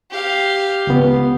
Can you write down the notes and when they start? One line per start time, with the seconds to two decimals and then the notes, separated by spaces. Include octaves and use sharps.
0.11 G4 F5
0.87 C#2 C#3 B3